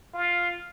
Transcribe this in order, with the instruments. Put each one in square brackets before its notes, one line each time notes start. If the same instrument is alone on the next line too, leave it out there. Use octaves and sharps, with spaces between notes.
[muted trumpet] F4